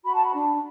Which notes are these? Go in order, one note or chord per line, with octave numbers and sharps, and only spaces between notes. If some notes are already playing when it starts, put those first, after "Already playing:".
F#4 B5
A5
B5
D4